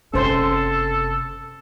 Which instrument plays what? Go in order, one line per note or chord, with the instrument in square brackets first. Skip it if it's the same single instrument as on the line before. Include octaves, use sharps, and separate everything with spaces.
[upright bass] F#1 C3 [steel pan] C#4 C5 [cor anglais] A4